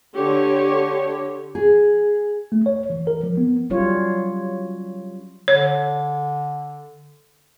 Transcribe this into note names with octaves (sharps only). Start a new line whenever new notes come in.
D3 G4 C#5
G#4
A3
C#5
E3
A#4
F3
B3
F#3 G3 C#4 F4 C#5
D3 C#5